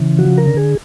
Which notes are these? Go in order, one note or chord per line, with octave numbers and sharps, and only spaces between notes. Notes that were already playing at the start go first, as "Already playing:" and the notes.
Already playing: C#3 E3
F3 F#4
A#4
D3
G#4